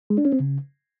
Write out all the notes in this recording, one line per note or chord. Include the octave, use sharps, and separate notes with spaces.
G#3
D4
C#4
C4
C#3